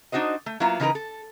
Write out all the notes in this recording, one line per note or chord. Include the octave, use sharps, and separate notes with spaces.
D4 D#4 F#4 C5 D#5
A3
F#3 A#3 B3 E4 F4
C#3 E3 D#4 G#4 A#4 B4
A4